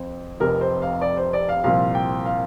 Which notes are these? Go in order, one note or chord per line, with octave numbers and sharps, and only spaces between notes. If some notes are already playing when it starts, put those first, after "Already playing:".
Already playing: F2 C4
F1 F2 C3 A#4
C5
F5
D5
C5
D5
F5
C2 A#2 F3 F5
G5
F5